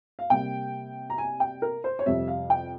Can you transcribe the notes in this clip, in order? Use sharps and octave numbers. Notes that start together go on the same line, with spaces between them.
F5
C3 G3 A#3 G5
A#5
G#5
G5
A#4
C5
C#5
F2 C3 G3 C4 E5
F5
G5